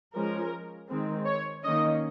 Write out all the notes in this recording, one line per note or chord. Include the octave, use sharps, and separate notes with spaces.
F3 G#3 C#4 A#4
D#3 G#3 C4
C#5
D#3 A#3 C#4 D#5